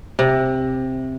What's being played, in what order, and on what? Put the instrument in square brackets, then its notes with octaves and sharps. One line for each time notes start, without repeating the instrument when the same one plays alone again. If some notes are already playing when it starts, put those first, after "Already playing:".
[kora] C3